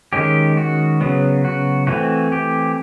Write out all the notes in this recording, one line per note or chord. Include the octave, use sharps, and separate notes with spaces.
D#3 G#3 C#4 G4
F#4
C#3 F#3 B3
F#4
E3 A3 C4 F#4
G4